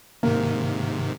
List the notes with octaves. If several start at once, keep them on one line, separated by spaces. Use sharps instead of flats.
G#2 C3 D#3 A#3